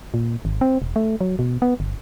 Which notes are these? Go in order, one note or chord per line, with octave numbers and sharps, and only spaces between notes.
A#2
G#1
C4
E1
A3
F#3
B2
B3
G1